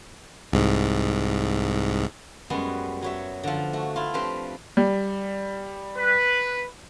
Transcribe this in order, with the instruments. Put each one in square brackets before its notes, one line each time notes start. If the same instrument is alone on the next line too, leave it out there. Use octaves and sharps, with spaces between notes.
[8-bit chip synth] C2 G#2
[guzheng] F#2 G3 G#3 B3 F#4
F#3 C#5 E5
D3 F3
A3 F#4
E4 F4
F3 C4 D4 G4 B4 C5
[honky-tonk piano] G3
[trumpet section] B4